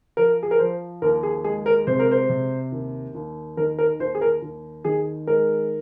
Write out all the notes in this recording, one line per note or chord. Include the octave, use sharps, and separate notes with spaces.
F3 A#4
G#4
A#4
F3 C5
D#2 A#4
G#4
G#3 G#4
A#4
C3 C5
A#4
C5
C3
D#2
D#2
D#3 A#4
A#4
D#2 C5
G#4
A#4
D#2
D#3 G#4
G#3 A#4